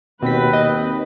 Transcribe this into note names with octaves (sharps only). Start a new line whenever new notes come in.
D#2 B2 C4 B4 B6
D#5